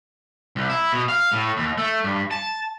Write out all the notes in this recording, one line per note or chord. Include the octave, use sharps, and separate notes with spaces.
C2
E4
B2
F5
A2
D#2
A3
G2
A5